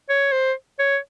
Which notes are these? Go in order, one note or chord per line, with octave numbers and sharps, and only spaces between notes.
C#5
C5
C#5